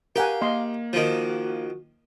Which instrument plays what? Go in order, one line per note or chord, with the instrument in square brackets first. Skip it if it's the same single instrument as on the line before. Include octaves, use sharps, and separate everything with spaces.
[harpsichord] G4 [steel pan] A#4 F#5 G#5 [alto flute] F5
[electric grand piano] A#3 [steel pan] D#5 C6
[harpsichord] D#3 F3 [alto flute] F#4